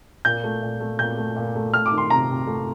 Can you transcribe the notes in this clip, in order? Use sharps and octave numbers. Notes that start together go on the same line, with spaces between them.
A#2 G6
A3
A#2
A3
A#2 G6
A3
A#2
A3
A3 F6
D6
D#3
C6
C3 A#5
C3
A3